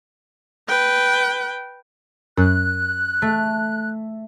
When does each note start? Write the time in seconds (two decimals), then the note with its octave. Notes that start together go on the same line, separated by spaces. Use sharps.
0.68 B4 G5
2.37 F#2 F#6
3.22 A3